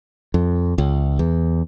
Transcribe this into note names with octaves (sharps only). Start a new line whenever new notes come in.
F2
C#2
E2